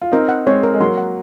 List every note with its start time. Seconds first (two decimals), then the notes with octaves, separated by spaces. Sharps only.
0.02 F4
0.12 C4 D#4 A#4
0.29 F#5
0.46 G#3 C4 C#5
0.63 A#4
0.74 G#3
0.80 F#3 A#3 C6
0.98 F#5